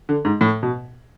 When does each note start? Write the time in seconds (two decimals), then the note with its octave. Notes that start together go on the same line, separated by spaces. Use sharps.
0.09 D3
0.25 G#2
0.41 A2
0.63 B2